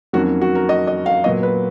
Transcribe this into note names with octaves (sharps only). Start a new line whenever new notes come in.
F2 D#3 F#3 A#3 C#4 F#4
F#4
A#4
D#5
D#5
F5
A#2 F#3 B3 D#5
B4